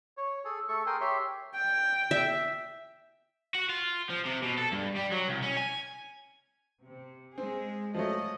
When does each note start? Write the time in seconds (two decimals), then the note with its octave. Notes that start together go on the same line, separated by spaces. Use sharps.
0.17 C#5
0.45 G#4 A4
0.69 A3 A4 C#6
0.86 G#4 A#4 G5 G#5 C6
1.01 G4 C#5 E5 C6
1.56 G5
2.11 E5
3.55 F#4
3.69 F4
4.10 F3
4.25 C3
4.43 B2
4.58 A4
4.72 G2
4.96 G3
5.12 F#3
5.28 C2
5.42 C#4
5.57 G#5
6.82 C3
7.38 G#3 C4 G#4
7.95 F3 F#3 A3 D#5